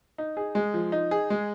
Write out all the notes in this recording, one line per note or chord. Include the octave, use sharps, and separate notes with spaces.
D#4
G#4
G#3
F3
D#4
G#4
G#3